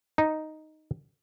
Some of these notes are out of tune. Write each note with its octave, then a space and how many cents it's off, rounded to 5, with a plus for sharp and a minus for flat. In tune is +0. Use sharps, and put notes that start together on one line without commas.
D#4 +0